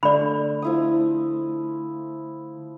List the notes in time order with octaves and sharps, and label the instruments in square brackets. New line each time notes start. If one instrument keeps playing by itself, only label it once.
[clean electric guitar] D3 A3 [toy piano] D5 B5
[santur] F3 E4 D#6